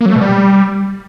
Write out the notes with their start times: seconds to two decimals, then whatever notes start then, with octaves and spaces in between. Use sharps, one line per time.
0.01 A#3
0.06 F#3
0.11 A3
0.16 B2
0.21 G3